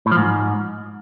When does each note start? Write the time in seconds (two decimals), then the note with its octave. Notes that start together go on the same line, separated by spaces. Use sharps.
0.06 A2
0.11 F3
0.17 G#2